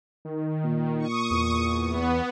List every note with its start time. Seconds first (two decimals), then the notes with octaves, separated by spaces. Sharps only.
0.25 D#3
0.65 A#2
0.99 C#6 D#6
1.31 E2
1.91 B3